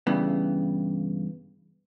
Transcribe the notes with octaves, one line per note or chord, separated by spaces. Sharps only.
G2 C#3 E3 B3